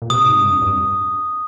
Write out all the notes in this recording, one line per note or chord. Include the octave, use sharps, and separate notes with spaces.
A#2
C3 D#6
G#2
G2
F2
G2